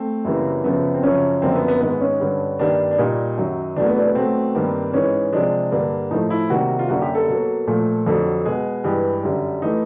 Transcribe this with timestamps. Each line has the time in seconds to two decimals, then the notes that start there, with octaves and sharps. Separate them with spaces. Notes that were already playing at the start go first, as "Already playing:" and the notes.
Already playing: A3 C4
0.25 F#2 C#3 E3 G3 A#3
0.64 F#2 C#3 F3 B3
0.94 C4
1.03 F#2 C#3 F3 C#4
1.42 F#2 D3 F3 A#3 C4
1.55 B3
1.68 B3
1.81 G#2 D#3 G#3 B3
2.01 C#4
2.20 G2 D3 G3
2.59 G2 D#3 G3 A#3 D4
2.91 D4
2.98 A#2 G3 A#3 D#4
3.38 F#2 D#3 F#3
3.76 E2 B2 F#3 A3 D4
3.87 B3
3.96 D4
4.06 B3
4.15 B2 F#3 A3 C4
4.55 G2 D#3 G3 A#3
4.93 G#2 E3 G#3 C#4
5.33 C3 F3 G#3 D4
5.71 G2 D3 G3 A#3
6.11 A2 F3 A3 D#4
6.30 E4
6.50 C3 D#3 G3 A#3 F#4
6.79 F4
6.89 F#2 D3 G3 A#3 F#4
7.02 G4
7.15 A4
7.28 B2 F#3 A#3
7.67 A#2 F3 A3
8.07 F2 D3 F#3 A4
8.45 B2 G#3 G#4
8.84 G2 E3 G#3 G4
9.24 F#2 D3 G3
9.62 E3 A3 D#4